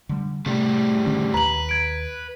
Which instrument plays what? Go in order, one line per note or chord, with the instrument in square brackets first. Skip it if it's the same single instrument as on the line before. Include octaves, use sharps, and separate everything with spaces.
[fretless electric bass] D3 G3
[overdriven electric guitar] A2 G3 [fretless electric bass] C3 A3
[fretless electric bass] D3 D#3 C#4
[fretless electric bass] D#2 [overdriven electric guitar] B4 [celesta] A#5 F#7
[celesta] G#6 D7